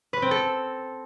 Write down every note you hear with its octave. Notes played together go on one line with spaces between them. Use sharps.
B4
C4
A4